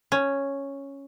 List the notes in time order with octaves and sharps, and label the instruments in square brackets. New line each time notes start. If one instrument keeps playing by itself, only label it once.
[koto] C#4